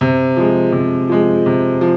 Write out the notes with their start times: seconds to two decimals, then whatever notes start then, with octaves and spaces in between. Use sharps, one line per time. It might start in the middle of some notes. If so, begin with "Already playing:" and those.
0.01 C3
0.37 F3 G#3
0.72 C3
1.09 F3 G#3
1.46 C3
1.81 F3